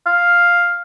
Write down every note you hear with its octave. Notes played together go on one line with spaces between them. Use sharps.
F5